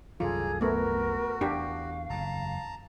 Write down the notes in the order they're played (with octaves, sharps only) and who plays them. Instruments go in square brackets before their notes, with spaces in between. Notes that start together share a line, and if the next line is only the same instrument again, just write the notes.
[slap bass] C2 F#2 E3 [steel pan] F4 [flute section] G#4 A4 [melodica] D5 A#5
[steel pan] A3 B3 [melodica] F#4 [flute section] A#4 B4
[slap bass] E2 [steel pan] D4 G4 [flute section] F5
[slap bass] F#1 E2 [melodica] A5 A#5